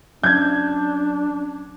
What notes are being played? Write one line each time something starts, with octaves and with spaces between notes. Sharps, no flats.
F#3 C#4 D4 G6 G#6